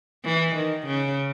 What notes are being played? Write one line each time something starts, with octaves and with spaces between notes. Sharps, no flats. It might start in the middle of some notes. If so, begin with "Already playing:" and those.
E3
D#3
C#3